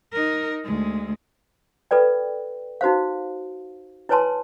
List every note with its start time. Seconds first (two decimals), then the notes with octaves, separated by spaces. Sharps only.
0.12 D#4 A#4
0.64 D2 G#3
1.91 F4 A4 B4 D5 G5
2.81 D#4 F#4 C5 F5
4.09 E4 B4 C#5 G#5 A5 C6